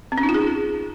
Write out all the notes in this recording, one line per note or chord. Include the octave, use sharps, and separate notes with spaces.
C4
C#4
D#4
F4
G#4